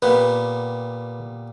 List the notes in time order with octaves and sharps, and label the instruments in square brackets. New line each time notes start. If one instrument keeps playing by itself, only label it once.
[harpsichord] A#2 G3 B3 [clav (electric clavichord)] B4